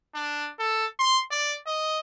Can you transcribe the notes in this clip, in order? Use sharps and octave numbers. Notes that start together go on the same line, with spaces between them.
D4
A4
C6
D5
D#5